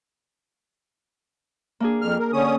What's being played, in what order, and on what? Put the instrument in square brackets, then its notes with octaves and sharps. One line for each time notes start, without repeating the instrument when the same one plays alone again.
[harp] A#3 D4 G#4
[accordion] F2 F6
A#4
D3 C#4 D#6